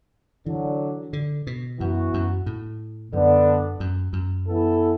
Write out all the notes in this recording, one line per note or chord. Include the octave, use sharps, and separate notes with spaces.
D3 E3 F#3 D4
D3
B2
F#2 E3 B3 F#4
F#2
A2
F#2 D3 B3 D4
F#2
F#2
E3 B3 E4 A4